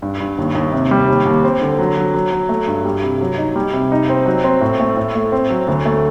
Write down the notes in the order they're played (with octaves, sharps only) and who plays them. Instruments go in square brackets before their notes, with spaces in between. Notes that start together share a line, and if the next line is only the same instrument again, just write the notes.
[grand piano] G2
G2
D#2
D#2
C3
G3
D#2
D#2
C4
D3
F#3
F#3
F#3
F#3
A3
G2
G3
C3
F#3
D#4
G3
C3
D#4
C4
F#3
C4
A2
A3
A2
A3
C4
F#3
D2
A3